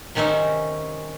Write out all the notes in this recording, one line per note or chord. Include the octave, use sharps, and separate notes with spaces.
C3 D#3 C#4 D#4 E5